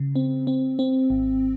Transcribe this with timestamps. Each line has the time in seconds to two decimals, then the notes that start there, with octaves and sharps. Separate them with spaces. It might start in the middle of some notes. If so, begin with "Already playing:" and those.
Already playing: C#3
0.16 C4
0.47 C4
0.79 C4
1.10 G#1